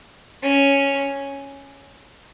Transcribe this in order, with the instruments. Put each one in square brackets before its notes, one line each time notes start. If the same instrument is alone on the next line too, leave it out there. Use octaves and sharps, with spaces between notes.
[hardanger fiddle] C#4